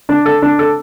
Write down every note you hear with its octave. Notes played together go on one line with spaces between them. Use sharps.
D4
A4
D4
A4